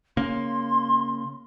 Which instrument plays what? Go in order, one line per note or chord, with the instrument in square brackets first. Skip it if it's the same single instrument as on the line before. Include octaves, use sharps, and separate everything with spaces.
[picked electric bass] C#3 A#3 [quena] C6